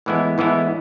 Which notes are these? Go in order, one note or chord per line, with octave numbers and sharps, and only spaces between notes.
A2 E3 G#3 B3 E4
A2 E3 G#3 B3 E4